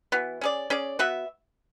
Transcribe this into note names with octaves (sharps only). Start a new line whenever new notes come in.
E3 B3 F#4
C#4 G#4 D5
C#4 G#4 D5
B3 F#4 B4 E5